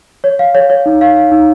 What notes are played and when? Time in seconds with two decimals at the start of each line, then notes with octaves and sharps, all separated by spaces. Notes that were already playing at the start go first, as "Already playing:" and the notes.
0.24 C#5
0.39 F5
0.55 C#5
0.70 C#5
0.86 D#4
1.01 F5
1.17 F5
1.32 D#4